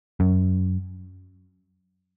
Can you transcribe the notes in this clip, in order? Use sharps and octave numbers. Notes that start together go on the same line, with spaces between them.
F#2